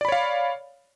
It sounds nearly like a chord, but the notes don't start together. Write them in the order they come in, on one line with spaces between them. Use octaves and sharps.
D5 B5 C#5 F5